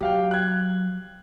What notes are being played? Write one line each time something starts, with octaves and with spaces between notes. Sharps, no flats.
F#3 G4 F5 G5
F#6 G#6